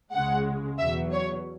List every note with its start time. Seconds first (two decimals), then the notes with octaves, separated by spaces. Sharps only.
0.12 C#2 C#3 G#3 F#5
0.78 E2 B2 F#3 E5
1.12 C#5